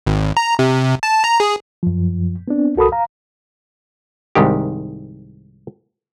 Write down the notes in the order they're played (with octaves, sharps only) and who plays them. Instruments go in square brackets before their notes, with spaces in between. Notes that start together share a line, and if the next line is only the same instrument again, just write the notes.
[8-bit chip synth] G#1
A#5
C3
A5
A#5
G#4
[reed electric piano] F#2 F3
B3 C4 D4
C2 F#4 A4 A#4 B5 D#6
F5 A#5
[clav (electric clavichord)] C2 G#2 D#3 G4